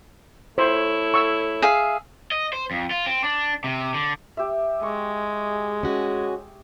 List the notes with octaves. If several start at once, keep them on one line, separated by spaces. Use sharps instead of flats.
A3 E4 A4 C5 C#5
C#6 E6
G#4 E5 F5
D#5
C5
F2
F4
C4
D4
C3
D3
G4 E5
G#3 C#6
C#4 F#4 G#4